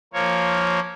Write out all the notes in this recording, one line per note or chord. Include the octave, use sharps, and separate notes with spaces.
F3 A#3 C#5